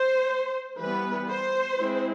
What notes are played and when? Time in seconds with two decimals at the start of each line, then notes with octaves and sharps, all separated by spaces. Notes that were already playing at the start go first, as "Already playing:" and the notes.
Already playing: C5
0.80 E3 G3 B3 B4
1.30 C5
1.79 G#3 C4 E4